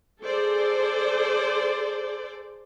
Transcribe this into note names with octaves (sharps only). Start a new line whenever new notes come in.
G#4 A4 C5 D5